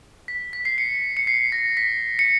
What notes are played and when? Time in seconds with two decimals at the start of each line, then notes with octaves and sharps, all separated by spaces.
0.28 B6
0.53 B6
0.65 C7
0.78 C#7
1.17 C#7
1.27 C7
1.52 A#6
1.77 B6
2.19 C#7